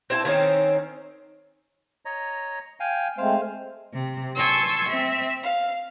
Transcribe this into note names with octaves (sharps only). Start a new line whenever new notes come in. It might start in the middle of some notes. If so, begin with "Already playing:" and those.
C4 E4 A5
D#3 C4 C#4 D#4
C#5 D#5 A#5
F5 G5 G#5
G#3 A3 C4 C5 F5
C3
G#5 A5 C6 C#6 E6
C4 E5
F5